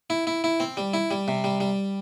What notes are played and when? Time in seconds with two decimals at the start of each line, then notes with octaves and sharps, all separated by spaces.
0.10 E4
0.27 E4
0.44 E4
0.60 C4
0.77 G3
0.94 E4
1.11 G3
1.28 C3
1.44 G3
1.60 G3